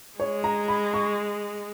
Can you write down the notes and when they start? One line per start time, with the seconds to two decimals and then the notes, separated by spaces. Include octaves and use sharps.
0.19 G#3 C#5
0.44 A#5
0.68 B5
0.94 C#6